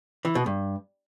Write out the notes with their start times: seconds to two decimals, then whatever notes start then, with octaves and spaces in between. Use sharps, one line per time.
0.25 E3
0.35 B2
0.46 G2